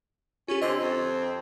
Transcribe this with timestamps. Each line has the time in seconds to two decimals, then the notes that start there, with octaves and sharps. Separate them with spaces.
0.48 C#4 F4 G4
0.62 D3 C4 D#5 G#6
0.80 F2